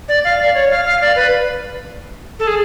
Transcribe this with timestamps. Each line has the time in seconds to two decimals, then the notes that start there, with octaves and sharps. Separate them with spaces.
0.09 D5
0.24 F5
0.39 D5
0.54 C#5
0.70 F5
0.85 F5
1.01 D5
1.16 B4
2.39 A4
2.47 G#4